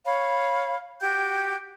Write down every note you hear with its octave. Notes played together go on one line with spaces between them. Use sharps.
C#5 F5 B5
F#4 G4 G5 G6